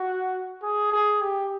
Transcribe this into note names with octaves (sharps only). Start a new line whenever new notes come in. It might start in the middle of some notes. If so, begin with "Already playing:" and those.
Already playing: F#4
G#4
G#4
G4